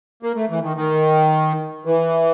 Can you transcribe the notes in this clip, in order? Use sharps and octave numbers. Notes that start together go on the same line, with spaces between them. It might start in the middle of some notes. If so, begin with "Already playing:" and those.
A#3
A3
E3
D#3
D#3
E3